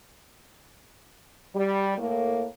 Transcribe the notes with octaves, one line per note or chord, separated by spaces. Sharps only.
G3
A2 A#3